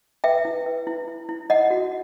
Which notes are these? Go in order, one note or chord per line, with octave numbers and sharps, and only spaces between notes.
B4 E5 G5
E4
B4
E4
E4
E4
D#4 D#5 F#5
F#4